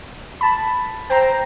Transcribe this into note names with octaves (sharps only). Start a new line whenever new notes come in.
A5 B5
C5 G5 A#5